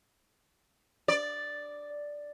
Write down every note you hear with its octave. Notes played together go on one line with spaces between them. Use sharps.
D5